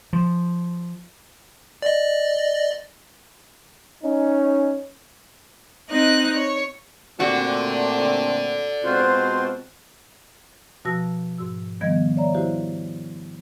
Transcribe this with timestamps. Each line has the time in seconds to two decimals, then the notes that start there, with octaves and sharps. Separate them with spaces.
0.13 F3
1.82 D5 D#5
4.03 C#4 D#4
5.89 C4 D#4 D#5 F#6
6.35 C#5
7.20 A#2 A3 C4 F#4 G4 A4 D5
8.84 B2 G#3 C4 F4 F#4 C5
10.85 B2 F3 F#4 A5 E6 A#6
11.38 G#2 F#4 E6
11.81 D#3 F3 G3 B3 D#5 G#6
12.17 C#5 D5 E5 A#5
12.34 E4 F#4 G4 C5 F5